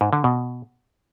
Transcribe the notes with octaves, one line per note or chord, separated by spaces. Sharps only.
G#2
D3
B2